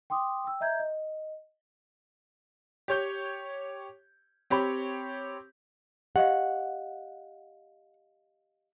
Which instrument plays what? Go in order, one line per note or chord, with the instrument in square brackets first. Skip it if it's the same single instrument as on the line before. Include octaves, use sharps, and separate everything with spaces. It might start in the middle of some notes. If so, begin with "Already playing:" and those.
[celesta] G5 C6 D6 D#6
G5 E6
D#5 E5 A#5 G6 G#6
D#5
[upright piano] G4 C#5 G6
C4 G4 C#5 B5
[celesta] G4 D#5 F5 [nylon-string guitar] F#5